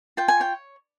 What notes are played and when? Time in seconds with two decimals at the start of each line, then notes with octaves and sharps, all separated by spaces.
0.17 F4 G5
0.28 G#5
0.40 C#5 G5